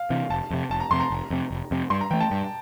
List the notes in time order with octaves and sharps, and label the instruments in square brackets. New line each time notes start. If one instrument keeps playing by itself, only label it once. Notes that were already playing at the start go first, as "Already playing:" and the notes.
Already playing: [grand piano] F5
[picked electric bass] C3 E3
[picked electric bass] F1 [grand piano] A5
[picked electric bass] F2 C3
[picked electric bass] F1 [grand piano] A5
[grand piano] A#5
[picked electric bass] F2 C3 [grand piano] C6
[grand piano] A#5
[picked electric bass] F1
F2 C3
F1
F2 C3
[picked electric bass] G2 [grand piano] C6
[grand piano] A#5
[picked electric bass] E3 A3 [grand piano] G5
[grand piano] A5
[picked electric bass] G2